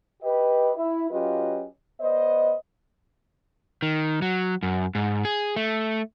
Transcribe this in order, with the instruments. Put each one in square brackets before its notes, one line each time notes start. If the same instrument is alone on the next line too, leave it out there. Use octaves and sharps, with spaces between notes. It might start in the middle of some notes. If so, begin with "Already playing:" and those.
[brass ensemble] G4 B4 D#5
E4
F#3 C#4 F4 G4 B4 D#5
B3 C5 D5 D#5
[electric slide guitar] D#3
F#3
F#2
G#2
G#4
A3